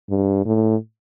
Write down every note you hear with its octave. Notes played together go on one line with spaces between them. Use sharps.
G2
A2